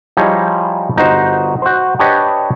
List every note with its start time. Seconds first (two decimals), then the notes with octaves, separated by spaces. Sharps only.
0.17 F3 G3 D#4 E4 G#4 C#5
0.96 G1 D#4 F#4 C5
1.62 F#4 C5
1.99 D4 G4 B4 C#5 D#5